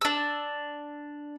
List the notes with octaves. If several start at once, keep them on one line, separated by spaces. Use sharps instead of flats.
D4 E6